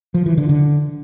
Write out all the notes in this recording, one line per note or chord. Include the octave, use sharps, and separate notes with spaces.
F3
E3
D3
D3